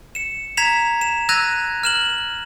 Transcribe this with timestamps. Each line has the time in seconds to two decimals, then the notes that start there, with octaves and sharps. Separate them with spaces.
0.15 C#7 E7
0.57 A#5 G#6 B6 E7 F7
1.01 E7
1.29 E6 F#6 G#6 A#6 D#7 F7
1.83 F6 E7 F#7